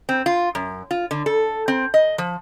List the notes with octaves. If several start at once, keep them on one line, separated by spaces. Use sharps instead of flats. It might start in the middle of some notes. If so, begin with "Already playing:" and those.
C4
F4
F#2
F4
D3
A4
C4
D#5
F3